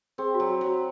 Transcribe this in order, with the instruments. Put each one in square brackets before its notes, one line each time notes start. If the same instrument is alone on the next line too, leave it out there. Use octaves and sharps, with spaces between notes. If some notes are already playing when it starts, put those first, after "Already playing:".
[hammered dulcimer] C4 [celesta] G#4
[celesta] F#4
[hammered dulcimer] F#3
[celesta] F#4
[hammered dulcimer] F#3
[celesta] F#4